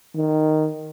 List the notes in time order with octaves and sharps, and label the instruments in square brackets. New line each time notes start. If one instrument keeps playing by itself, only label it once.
[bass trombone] D#3